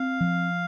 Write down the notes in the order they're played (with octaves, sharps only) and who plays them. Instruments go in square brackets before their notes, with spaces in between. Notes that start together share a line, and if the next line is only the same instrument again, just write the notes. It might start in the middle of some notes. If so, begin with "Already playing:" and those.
Already playing: [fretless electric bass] C4 [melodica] F5
[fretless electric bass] F3